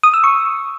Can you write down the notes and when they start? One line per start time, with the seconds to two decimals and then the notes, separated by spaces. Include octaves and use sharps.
0.03 D#6
0.14 E6
0.24 C#6